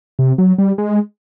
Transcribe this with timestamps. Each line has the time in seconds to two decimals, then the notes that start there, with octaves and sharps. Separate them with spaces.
0.19 C3
0.38 F#3
0.58 G3
0.78 G#3